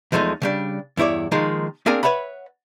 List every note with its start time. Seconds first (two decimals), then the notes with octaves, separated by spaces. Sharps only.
0.12 E2 F3 G#3 A3 D#4
0.42 C#3 G3 D4
0.97 E2 G2 E4 C#5 D5
1.32 D#3 F3 G#3 A#3 D#4
1.86 A#3 C4 D4 G#4 A#4 G#5
2.03 B4 C#5 E5 F#5 B5